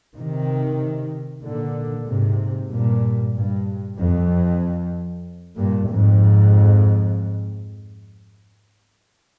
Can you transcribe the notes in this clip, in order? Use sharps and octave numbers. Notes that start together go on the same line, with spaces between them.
C3 D#3
A#2 D3
G#2 C3
G2 A#2
G2
F2
G2 A#2
F2 G#2